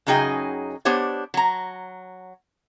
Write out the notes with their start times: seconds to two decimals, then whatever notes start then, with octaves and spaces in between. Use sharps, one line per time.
0.07 F#2 C#3 F#3 D#4 G#4 G5
0.85 B3 D4 G4 C5 C#5
1.34 F#3 A#5